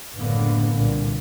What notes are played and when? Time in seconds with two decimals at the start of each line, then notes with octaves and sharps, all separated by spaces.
0.15 F#1 A2 D3 A#3 B3
0.75 C2 A#2 D3